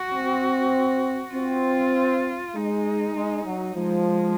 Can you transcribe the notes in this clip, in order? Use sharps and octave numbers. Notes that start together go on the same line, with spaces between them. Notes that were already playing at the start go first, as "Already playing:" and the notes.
Already playing: F#4
C4
C4 F4
G#3 D#4
G#3
F#3
F3 G#3